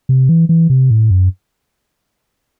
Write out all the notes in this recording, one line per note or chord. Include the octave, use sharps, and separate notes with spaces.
C3
E3
E3
C3
A2
F#2